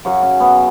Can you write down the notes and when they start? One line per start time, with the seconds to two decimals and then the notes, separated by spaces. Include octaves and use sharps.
0.05 F#2 C#3 F#3 F#4
0.23 C#4
0.40 B3